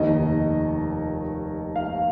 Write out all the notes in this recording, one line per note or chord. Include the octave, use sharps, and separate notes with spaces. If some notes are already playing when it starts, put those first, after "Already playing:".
Already playing: F1 D#2 D#3 D#5
F5